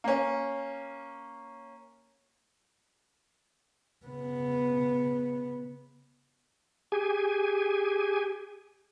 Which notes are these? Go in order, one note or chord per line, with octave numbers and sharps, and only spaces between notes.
A#3 C#4
C#3 B3
G4 G#4 G#5